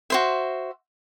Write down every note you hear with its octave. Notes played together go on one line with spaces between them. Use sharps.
F#4 C5 E5